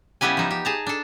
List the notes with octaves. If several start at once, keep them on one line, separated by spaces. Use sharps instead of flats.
C#3 G3 B3 E4 G4 G#5
F3 D#4
G4
G#4 A5 A#5
D4 A4